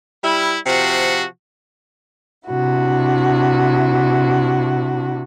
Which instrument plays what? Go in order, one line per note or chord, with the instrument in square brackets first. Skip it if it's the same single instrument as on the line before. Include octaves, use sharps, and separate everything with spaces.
[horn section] G3 E4
C3 F3 F#4
[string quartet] C3 D4 E4 F#4